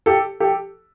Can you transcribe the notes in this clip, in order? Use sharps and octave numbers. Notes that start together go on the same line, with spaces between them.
G4 A4
G4 A4